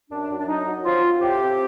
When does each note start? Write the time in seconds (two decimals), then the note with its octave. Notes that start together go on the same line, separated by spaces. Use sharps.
0.10 F#2 D4
0.29 F#2
0.39 D4
0.47 F#3 D#4
0.66 F#3
0.84 C4 F4
1.02 C4
1.21 A2 G4
1.40 C4